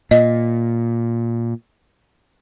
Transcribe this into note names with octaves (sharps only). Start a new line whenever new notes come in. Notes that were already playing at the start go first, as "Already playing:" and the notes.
A#2 D#5